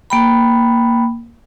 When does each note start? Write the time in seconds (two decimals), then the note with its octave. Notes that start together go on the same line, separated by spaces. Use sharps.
0.10 A#3 G5 B5